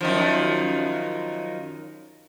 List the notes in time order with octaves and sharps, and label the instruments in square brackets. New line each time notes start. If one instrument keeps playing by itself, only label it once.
[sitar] F#2 D#3 F3